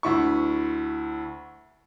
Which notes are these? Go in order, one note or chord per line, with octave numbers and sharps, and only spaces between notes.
D2 E4 C#6